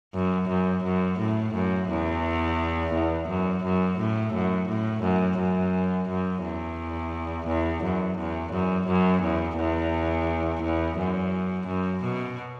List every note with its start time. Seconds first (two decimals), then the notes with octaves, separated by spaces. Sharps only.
0.14 F#2
0.49 F#2
0.84 F#2
1.19 A2
1.54 F#2
1.89 E2
2.94 E2
3.28 F#2
3.63 F#2
3.98 A2
4.34 F#2
4.69 A2
5.03 F#2
5.38 F#2
6.09 F#2
6.43 E2
7.47 E2
7.83 F#2
8.18 E2
8.52 F#2
8.87 F#2
9.23 E2
9.57 E2
10.62 E2
10.98 F#2
11.67 F#2
12.03 B2